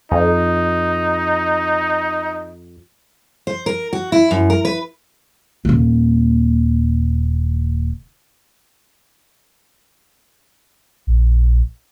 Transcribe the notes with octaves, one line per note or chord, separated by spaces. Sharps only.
F2 D#4
C5
A#4
F#4
E4
F#2
A#4
B4
D#1 A#3
A#1